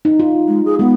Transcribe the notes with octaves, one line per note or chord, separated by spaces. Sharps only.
D#4
F4
G#3
G#4
G#3 B3